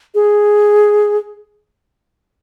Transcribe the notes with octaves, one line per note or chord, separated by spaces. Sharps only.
G#4